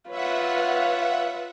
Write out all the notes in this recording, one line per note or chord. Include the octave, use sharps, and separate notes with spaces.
F4 B4 C#5 E5 F#5